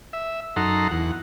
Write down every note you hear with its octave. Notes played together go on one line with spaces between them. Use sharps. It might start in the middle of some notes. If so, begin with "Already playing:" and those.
E5
F#2 D#4 A4 F#5 A#5 C6
E2 F#5